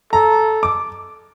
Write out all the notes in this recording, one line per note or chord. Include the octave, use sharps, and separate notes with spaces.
A4 A#5
D6